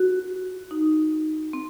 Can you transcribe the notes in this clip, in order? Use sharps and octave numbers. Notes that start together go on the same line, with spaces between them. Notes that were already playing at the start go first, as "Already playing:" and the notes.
Already playing: F#4
D#4
C4